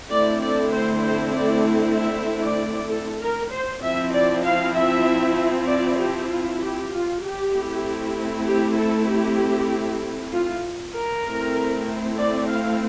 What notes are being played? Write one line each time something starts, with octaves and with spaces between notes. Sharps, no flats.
D3 A3 C4 E4 D5
D5
C5
C5
D5
E5
D5
A4
A#4
C5
F3 C4 E4 E5
D5
F5
E5
D5
G4
F4
G4
F4
G4
A3 C4 E4
G4
A4
G4
F4
A#4
A3 C4 E4
D5
F5